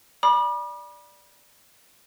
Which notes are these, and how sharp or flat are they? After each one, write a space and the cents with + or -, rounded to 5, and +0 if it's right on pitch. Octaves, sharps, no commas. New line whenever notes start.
D5 +0 B5 -35 D6 +40